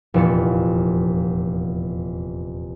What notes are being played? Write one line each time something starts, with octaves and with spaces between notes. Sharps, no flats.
F1 E2 A#2 F3 D5 C#7